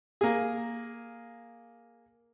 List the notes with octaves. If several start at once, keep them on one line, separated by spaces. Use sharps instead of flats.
A#3 G#4